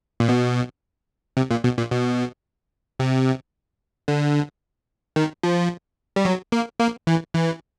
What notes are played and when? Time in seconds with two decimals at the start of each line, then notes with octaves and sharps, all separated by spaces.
0.20 A#2
0.29 B2
1.37 C3
1.51 A#2
1.64 B2
1.78 A#2
1.92 B2
3.00 C3
4.08 D3
5.16 D#3
5.43 F3
6.16 G3
6.25 F#3
6.52 A#3
6.79 A#3
7.07 E3
7.34 E3